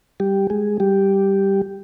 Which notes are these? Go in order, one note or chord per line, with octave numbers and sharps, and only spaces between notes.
G3 G4
G#3 G#4
G3 G4